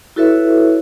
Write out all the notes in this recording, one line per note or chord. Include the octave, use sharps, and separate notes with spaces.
E4 F#4 A4 B4 C#5 E5